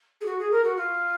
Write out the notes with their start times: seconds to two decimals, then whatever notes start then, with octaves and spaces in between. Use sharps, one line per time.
0.21 G#4
0.25 F#4
0.38 G#4
0.51 A#4
0.63 F#4
0.76 F4